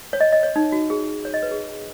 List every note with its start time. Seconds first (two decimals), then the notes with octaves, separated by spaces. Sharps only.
0.13 C#5
0.21 D#5
0.32 D#5
0.43 C#5
0.56 D#4
0.72 F#4
0.90 G#4
1.25 C#5
1.34 D#5
1.43 B4
1.51 G#4